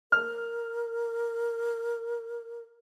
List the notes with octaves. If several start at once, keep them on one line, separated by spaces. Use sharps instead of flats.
A#4 F6